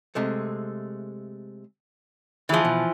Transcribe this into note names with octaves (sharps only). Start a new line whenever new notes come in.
C3 G#3 A3
D2 E3 F3 G#4
B2